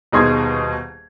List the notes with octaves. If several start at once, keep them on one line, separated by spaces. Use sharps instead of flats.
D#1 B2 D#4 G#4 C6 G#6